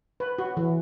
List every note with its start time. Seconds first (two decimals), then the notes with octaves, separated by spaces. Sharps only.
0.20 B4
0.39 F#4
0.57 E3